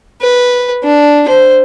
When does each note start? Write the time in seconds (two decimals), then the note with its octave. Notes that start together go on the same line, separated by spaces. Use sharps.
0.21 B4
0.84 D4
1.28 C5